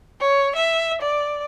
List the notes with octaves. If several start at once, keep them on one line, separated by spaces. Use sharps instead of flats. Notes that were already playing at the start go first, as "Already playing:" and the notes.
C#5
E5
D5